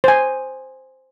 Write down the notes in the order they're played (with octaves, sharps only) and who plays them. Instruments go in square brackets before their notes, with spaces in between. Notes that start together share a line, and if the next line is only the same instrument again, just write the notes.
[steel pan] C5 G#5